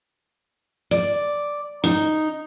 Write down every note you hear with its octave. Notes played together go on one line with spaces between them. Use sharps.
D5
D#4